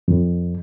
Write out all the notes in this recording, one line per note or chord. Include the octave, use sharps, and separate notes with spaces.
F2